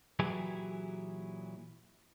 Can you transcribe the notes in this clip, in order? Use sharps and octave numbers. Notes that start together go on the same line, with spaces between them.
A#2 E3 F#3 E4 G4 G#4